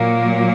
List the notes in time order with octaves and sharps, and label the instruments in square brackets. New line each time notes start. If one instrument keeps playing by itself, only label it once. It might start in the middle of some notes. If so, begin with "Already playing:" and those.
Already playing: [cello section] A#2 F#3 A#3